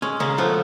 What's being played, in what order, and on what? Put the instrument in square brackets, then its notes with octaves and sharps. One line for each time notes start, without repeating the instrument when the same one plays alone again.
[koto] G#3 [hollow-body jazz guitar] C#4
[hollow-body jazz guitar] C#3 [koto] G#3 A#3
[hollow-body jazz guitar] F3 [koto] A3 B3